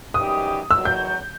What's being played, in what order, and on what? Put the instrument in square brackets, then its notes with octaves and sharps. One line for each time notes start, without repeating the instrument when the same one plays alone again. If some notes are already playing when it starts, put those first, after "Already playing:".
[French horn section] F#2 E3 G3 D#4 G4 [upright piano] D#6
[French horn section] E2 D#3 F#3 [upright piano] E6
[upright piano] G6